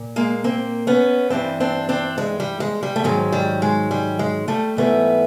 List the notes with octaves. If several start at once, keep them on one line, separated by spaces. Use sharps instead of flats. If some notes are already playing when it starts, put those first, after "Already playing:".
Already playing: A#2
G#3 A#3
A#3 C4
B3 C#4
G2 E3 G3 C4 D4
C4 D4
C4 D4
G#3
G3
G#3
G3
A3
G#2 D#3 F#3 G#3
G3
G#3
G3
G#3
G3 A3
G#2 E3 G3 A3 B3